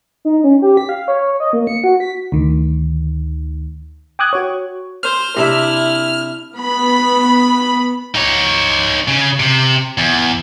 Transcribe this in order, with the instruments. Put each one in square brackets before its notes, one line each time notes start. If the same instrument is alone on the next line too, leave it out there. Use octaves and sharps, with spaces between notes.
[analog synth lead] D#4
C#4
G4
B6
F5
C#5
D#5
A#3
C#7
F#4
B6
[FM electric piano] D2 D#3
G5 D6 D#6 F#6 G#6
F#4 C#5
[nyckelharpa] C5 [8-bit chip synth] F6
[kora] C3 D4 E5 [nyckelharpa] E4
[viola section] B3 B5
[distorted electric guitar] D#4 C#5
C#3
C3
E2